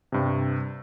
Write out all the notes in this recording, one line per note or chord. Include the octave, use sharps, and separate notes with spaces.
G2 C3